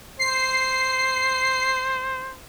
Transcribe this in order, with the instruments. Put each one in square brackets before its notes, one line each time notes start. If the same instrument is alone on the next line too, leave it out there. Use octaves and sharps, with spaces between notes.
[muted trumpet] C5 [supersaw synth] C7